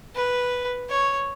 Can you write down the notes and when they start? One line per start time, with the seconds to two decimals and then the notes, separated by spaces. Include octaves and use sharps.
0.15 B4
0.89 C#5